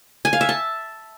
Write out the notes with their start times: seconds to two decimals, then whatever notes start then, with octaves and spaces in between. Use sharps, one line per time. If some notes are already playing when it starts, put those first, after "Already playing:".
0.25 G#5
0.33 F5
0.41 E5
0.49 A5